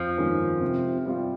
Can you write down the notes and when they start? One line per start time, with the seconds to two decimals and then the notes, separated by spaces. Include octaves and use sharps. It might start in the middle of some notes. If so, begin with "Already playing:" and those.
Already playing: F2 F3
0.18 D#3 G#3 C#4
0.61 C3
1.06 G3 C4 F4